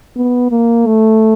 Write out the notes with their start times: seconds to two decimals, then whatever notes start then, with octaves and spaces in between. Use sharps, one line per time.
0.16 B3
0.51 A#3
0.86 A3